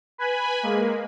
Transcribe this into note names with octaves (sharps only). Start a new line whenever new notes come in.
B4 G#5 B5
G#3 A#3